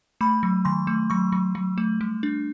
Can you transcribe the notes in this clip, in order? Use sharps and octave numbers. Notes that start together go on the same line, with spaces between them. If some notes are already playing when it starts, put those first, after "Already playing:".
A3 B5
F#3
D#3 C6
A3
F#3 C#6
F#3
F#3
A3
G3
D4